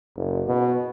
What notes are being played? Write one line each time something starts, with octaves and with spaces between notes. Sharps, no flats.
F#1
B2